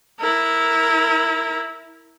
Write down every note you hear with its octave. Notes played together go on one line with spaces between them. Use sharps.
E4 A#4